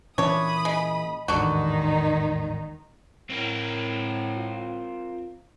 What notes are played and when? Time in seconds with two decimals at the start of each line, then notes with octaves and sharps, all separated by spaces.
0.18 A#2 E3 C#4 D4 C#5 B5 D#6
0.65 G#3
1.28 A1 E2 G#2 D3 D#3 D#4 F#4
3.30 A2 C4 A#4
4.37 F4